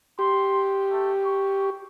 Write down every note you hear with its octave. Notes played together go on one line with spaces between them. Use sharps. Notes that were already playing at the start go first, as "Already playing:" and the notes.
G4 C6
A3
C#6